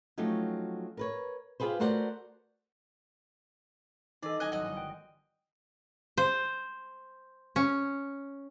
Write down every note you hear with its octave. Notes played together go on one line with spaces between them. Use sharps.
F3 F#3 A3 C#4 D#4 G4
A#4 B4 C#5
F4 G4 G#4 B4 C5
A3 F#4 A#4 C5 D5 F#5
E3 D#4 A4 D5 D#5 E6
C2 D#5 G#5 F#6
G#1 F#3 C#4 F#4 D#5
G1
G5
C5
C#4